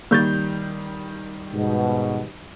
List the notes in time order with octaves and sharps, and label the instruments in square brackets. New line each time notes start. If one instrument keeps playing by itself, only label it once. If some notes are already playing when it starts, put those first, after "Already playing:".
[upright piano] D#3 G3 G6 [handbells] A#3 C#6 A6
[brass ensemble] G#2 B2